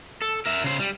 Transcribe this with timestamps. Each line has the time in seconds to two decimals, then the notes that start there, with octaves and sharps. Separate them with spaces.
0.22 A4
0.46 A#4 E5
0.64 C#3 C5
0.80 G3